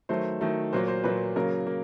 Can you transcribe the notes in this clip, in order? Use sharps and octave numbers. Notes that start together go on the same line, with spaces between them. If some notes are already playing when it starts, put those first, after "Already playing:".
D#3 F#3 A3 C5
D#3 F#3 A3
A#2 F#3 A#3 C5
C5
A#2 F#3 A#3 B4
C#3 F#3 A#3 A#4
A#3